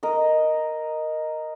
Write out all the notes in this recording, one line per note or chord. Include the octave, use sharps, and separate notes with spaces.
A#4 D#5